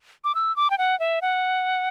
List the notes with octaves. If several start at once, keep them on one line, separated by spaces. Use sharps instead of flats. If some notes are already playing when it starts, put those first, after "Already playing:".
D6
E6
D6
G5
F#5
E5
F#5